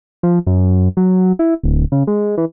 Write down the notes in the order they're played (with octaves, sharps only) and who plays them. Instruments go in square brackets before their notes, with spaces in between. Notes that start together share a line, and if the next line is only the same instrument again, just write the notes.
[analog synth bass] F3
F#2
F#3
E4
D1
C#3
G#3
E3